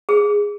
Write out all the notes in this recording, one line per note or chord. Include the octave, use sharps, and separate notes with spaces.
G#4